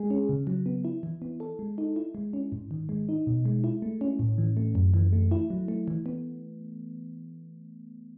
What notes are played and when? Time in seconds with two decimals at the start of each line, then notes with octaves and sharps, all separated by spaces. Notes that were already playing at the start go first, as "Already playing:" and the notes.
Already playing: G#3 G#4
0.10 C#4
0.29 C#3
0.47 F#3
0.66 B3
0.85 E4
1.03 E3
1.22 B3
1.40 A4
1.59 G#3
1.78 D#4
1.96 E4
2.15 G#3
2.33 C#4
2.52 G#2
2.71 D#3
2.89 G#3
3.09 D#4
3.27 B2
3.45 G#3
3.64 E4
3.82 A3
4.01 C#4
4.19 A2
4.38 E3
4.57 A3
4.75 F#2
4.94 E3
5.13 A3
5.31 E4
5.50 F#3
5.68 A3
5.88 E3
6.06 B3